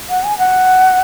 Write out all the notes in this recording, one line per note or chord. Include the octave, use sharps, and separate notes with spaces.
F#5
G#5
F#5